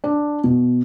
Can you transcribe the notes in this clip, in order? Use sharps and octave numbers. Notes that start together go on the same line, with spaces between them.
D4
B2